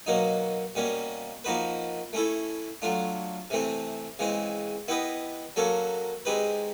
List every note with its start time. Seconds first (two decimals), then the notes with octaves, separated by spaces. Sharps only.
0.06 B2 F#3 A#3 D#4
0.75 B2 G3 A#3 C#4
1.44 F3 A#3 D#4 F#4 B4
2.13 A3 C#4 E4 A4
2.82 F#3 A3 D4 F4
3.50 C3 E3 A3 C4
4.19 C#3 E3 G#3 C4
4.88 B3 E4 G4 B4 D#5
5.56 F#3 A#3 C#4 F#4 A4
6.25 G#3 C4 D#4 G4 B4